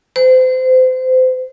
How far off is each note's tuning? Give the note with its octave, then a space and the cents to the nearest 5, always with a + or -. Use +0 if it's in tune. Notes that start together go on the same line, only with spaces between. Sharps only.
C5 -30